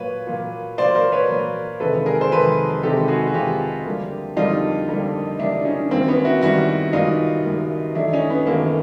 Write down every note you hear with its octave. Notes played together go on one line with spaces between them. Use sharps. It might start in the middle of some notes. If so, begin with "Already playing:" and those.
Already playing: A#2 F#3 A#3 B4 C#5
A#2 F#3 A#3
A#2 F#3 A#3 C5 D5
A#4 C5
B4 C#5
A#2 F#3 A#3
F2 C3 D#3 G#3 A4 B4
G#4 A#4
C5
F2 C3 D#3 G#3 A4 B4
F2 C3 D#3 G#3 G4 A4
F#4 G#4
F#4
F2 C3 D#3 G#3 F4 G4
F2 D3 G3 A#3
F2 D3 G3 A#3 D#4 F4
F2 D3 G3 A#3
F2 D3 G3 A#3 D4 E4
C#4 D#4
F#2 D#3 G3 A#3 C4
B3 C#4
E4 F#4
F#2 D#3 G3 A#3 E4 F#4
F#2 D#3 G3 A#3 D#4 F4
F#2 D#3 G3 A#3
F#2 D#3 F#3 A3 D4 E4
C#4 D#4
B3
F#2 D#3 F#3 A3 A#3